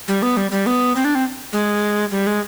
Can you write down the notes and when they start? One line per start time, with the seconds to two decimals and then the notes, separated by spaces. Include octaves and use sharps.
0.08 G3
0.22 B3
0.37 G3
0.51 G3
0.66 B3
0.96 C4
1.05 D4
1.15 C4
1.53 G#3
2.11 G3
2.27 G#3